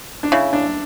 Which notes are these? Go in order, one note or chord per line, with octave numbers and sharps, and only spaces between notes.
D4
C#3 E4
D4